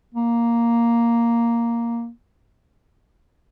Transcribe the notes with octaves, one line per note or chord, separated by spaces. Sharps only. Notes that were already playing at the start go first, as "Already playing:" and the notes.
A#3